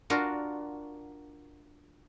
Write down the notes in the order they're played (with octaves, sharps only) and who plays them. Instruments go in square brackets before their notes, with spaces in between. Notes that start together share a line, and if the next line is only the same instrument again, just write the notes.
[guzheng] D4 F4 F#4 A#4